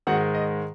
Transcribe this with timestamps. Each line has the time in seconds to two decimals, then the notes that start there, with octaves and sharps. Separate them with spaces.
0.07 G#2 D#3 G#3 F#4 F#5
0.34 D#5